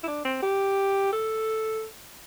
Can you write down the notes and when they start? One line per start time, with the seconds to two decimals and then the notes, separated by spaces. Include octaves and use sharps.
0.03 E4
0.07 D4
0.25 C4
0.42 G4
1.13 A4